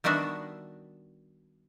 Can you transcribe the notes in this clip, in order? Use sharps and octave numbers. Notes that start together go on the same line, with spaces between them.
D#3 G3 B3 D4 F#4 E5